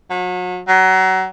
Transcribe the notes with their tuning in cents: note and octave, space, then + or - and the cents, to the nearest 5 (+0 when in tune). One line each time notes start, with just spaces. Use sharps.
F#3 -35
F#3 +25